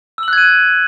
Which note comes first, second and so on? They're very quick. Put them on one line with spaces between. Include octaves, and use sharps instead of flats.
E6 F#7 F#6 G#6 D#7